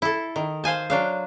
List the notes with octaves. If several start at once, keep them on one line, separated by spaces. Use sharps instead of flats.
E4 A4
D#3
C5 F5 G#5 A5
F#3 D4 F5